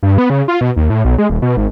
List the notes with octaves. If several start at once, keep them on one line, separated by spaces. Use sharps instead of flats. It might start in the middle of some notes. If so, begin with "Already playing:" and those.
G2
B3
C#3
F4
B2
D#2
A2
B1
G#3
D#1
B2
G#1